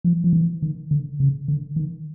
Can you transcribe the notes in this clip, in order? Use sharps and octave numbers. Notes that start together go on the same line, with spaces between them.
F3
F3
E3
D#3
D3
C#3
D3
D#3